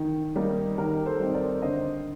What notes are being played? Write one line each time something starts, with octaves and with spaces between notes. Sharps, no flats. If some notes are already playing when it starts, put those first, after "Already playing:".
Already playing: D#3
G3 A#3 D#4
D#3 G4 A#4
A4 C5
G3 C4 D#4 C5
A#4 D5
D3 C5 D#5